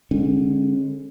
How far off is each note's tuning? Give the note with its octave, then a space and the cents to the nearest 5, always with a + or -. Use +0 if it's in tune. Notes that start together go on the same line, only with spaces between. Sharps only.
D3 +0 G#3 -20 C#4 -40